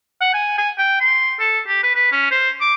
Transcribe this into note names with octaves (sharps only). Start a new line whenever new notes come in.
F#5
G#5
G#5
G5
C6
A4
G4
B4
B4
C#4
C5
D6